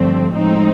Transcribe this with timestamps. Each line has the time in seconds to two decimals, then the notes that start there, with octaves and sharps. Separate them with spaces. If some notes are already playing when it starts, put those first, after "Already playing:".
Already playing: G2 D3 F3 A3 C4
0.34 A2 F3 G#3 C4 D#4